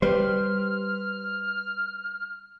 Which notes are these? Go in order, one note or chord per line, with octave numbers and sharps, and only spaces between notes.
G3 G4 B4 C5 F6